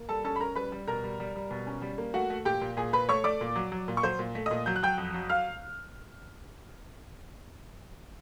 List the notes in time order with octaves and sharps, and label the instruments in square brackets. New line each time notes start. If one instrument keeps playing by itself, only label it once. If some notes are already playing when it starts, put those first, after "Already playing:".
Already playing: [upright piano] A#3
G3 A4 A5
C#4 A4 A5
B5
C#4 A#4 A#5
G3 B4 B5
G3
B2 A#4 A#5
G3
G3
G3
B2
C#4
G3
A#3
A3 F#4 F#5
A3
A#2 G4 G5
A#2
A#2 G#4 G#5
A#2 B4 B5
A3 C#5 C#6
A3 D5 D6
A#2
F#3
F#3
A#2
C#6
F#3 C5 C6
A#2
A3
A#2 D#5 D#6
F#3 G6
F#6
F#3 G5 G6
F2
F#3
F5 F6